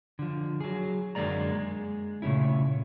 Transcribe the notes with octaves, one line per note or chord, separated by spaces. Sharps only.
D3 F3
F#3 G#4
F#2 D3 G#3 A#3 D5 A#5
G#3
A#2 C#3 A3 C#4 E4